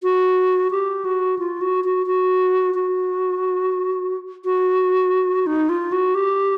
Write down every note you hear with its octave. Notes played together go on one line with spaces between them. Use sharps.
F#4
G4
F#4
F4
F#4
F#4
F#4
F#4
F#4
D#4
F4
F#4
G4